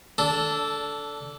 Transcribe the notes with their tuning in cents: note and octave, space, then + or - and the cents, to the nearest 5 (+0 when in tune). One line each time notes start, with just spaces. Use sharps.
D4 -20 A4 +0